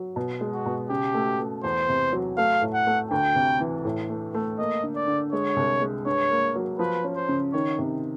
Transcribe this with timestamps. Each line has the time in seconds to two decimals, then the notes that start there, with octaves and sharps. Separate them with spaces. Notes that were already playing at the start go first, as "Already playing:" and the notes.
Already playing: F#3
0.16 B2
0.41 G#3
0.53 F#4
0.66 B2
0.90 C#3 G4
1.14 A3
1.39 A3
1.64 E2 C5
1.89 C3
2.12 F#3
2.37 A3 F5
2.62 A2
2.74 F#5
2.87 A3
3.11 D2 G5
3.36 C3
3.60 E3
3.85 A2
4.09 A3
4.34 A3
4.59 A#3 D#5
4.83 D3
4.96 D5
5.07 D3
5.32 G#3 C#5
5.56 C2
5.82 G#3
6.06 G2 C#5
6.31 A#3
6.56 F#3
6.79 F3 B4
7.04 C#4
7.16 C5
7.29 C#3
7.53 D#3 C#5
7.79 C3